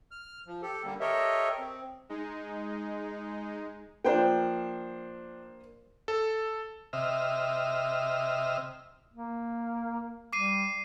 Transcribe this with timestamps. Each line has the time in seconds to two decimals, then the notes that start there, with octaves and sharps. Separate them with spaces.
0.11 F6
0.47 F3
0.62 G4 A4
0.84 D3 G3 A#3
1.00 G4 A4 A#4 C#5 D#5 E5
1.59 C4
2.09 G#3 D#4
4.05 F3 A#3 D4 C5 G5
6.08 A4
6.93 C3 D#5 E5 F6
9.14 A#3
10.33 G3 D6 C7 D#7